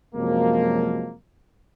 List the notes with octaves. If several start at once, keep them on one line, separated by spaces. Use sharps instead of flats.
F#2 C3 F3 F#3 G#3 A#3